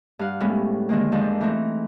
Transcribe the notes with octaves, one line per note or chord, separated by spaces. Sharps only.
G2 F5 F#5
A2 G3 G#3 B3 C#4 E4
D3 D#3 G#3 A#3
F2 F3 G#3 D4
E3 A3 C4 D#4